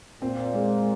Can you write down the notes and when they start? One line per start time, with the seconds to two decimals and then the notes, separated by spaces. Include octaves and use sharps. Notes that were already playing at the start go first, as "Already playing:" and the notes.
0.22 A#2 C4
0.54 G#3